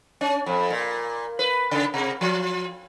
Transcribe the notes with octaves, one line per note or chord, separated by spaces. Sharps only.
C#4
F2
A#2
B4
C#3
C3
F3